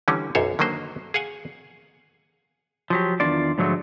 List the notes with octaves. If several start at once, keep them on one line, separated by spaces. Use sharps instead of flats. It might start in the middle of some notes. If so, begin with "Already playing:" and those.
D3 E3 G3 C#4
B1 F#2 C5 C#5
D3 D#3 F#3 A#3 C5
G#4 F5 F#5 G#5
F3 F#3 G4
E2 D#3 D4 F4 D5
G#2 D3 F3 F#3 G#3 A3